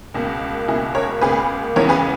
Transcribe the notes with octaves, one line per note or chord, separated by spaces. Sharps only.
C#2 B2 A#3
C#2 B2 A#3 E4 G#4
A#4 C#5
C#2 B2 A#3 G#4 B4
C#2 C#3 E3 B3 A#4 C#5
G#4 B4